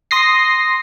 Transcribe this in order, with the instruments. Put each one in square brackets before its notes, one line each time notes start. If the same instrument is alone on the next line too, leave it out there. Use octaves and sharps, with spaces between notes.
[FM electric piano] C6 D#6 A#6 C7